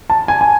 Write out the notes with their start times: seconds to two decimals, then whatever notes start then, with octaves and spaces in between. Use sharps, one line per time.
0.10 A5
0.28 G#5
0.41 G#5